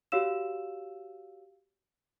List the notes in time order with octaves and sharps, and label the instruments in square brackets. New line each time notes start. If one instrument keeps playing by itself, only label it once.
[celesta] F#4 G4 C#5 F5 E6 E7